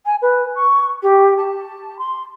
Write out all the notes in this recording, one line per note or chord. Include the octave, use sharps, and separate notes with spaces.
G#5
B4
C#6
G4
A5
C6